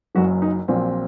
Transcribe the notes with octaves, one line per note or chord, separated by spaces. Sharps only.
F#1 F#2 F#3 F#4
D#4
A#1 A#2 F#3 C4